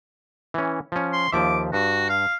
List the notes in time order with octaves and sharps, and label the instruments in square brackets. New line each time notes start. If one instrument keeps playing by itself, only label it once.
[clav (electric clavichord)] E3 C#4
F3 C#4
[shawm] C6
[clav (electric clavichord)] D#2 F3 E5 [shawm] D6
[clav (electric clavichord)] G2 [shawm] F#4
[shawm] F5